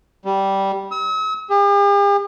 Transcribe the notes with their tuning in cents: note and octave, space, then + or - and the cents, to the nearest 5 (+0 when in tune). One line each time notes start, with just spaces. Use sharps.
G3 -10
E6 -45
G4 +45